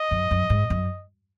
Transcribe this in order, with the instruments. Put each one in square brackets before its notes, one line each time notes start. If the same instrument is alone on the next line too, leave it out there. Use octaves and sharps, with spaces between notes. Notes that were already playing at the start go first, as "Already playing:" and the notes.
Already playing: [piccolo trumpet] D#5
[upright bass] F#2
F#2
G#2
F#2